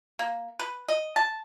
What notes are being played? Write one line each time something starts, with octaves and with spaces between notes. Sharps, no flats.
A#3
B4
D#5
A5